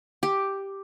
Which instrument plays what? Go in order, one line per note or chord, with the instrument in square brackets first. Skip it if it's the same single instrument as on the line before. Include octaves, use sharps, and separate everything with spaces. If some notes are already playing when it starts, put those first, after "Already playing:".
[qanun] G4